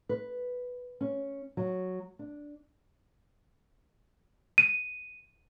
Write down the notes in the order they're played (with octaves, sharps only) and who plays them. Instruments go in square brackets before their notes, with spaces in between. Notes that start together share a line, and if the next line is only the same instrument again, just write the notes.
[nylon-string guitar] B4
C#4
F#3
D4
[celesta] D#7